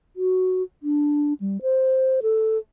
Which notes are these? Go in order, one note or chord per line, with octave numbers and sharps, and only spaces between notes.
F#4
D4
G3
C5
A4